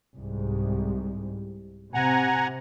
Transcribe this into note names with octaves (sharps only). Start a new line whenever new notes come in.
C2 G#2
C3 F#5 G#5 A#5